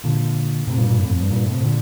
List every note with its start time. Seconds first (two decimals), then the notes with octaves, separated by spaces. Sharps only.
0.04 A#2 D3
0.67 A2 C3
0.78 G2 A#2
0.88 G2 A#2
0.99 F2 A2
1.09 F2
1.20 G2
1.31 G2 A#2
1.46 A2 C3
1.63 A#2 D3